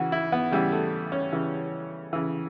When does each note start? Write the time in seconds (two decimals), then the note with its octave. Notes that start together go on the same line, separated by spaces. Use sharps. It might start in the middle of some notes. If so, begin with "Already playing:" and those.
Already playing: C#3 E3 F#4
0.12 E4
0.32 B3
0.51 C#3 E3 G3
0.72 A3
1.12 C#4
1.33 C#3 E3
2.13 C#3 E3